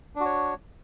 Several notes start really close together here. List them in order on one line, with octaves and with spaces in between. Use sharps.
D4 F#4 C#5